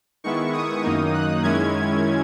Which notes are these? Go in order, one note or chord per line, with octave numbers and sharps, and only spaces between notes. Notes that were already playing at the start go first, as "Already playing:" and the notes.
D#3 G#3 B3 E4 C#6
D#6
F#2 D#3 A#3 D#4
F#6
F#2 D#3 G#3 C#4 E4 G#6